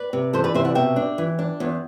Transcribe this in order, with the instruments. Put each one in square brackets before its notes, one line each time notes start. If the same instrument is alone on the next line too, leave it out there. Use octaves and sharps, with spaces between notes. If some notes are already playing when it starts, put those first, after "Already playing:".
Already playing: [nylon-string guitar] B4 D5
C3
E3 A4 C5
B4 D5
C3 C5 E5
D5 F#5
B2 E5 G5
D4
E3
D4
E2